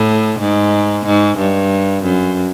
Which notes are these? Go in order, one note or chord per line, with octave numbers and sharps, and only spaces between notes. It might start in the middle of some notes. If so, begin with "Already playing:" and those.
Already playing: A2
G#2
G#2
G2
F#2